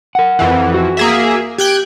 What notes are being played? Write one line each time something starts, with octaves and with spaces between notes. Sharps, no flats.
A#4 F#5
F2 E3
F#4
A#3 G#4 E5
G4 G5 F#6 G#6